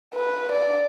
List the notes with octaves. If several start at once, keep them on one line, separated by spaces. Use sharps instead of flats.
B4
D5